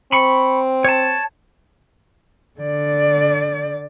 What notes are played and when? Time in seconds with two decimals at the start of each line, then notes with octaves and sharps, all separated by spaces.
0.12 C4 B5 C#6
0.84 C#5 A5
2.61 D3 D5